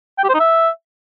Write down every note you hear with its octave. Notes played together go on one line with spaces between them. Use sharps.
G5
G4
C5
D#4
E5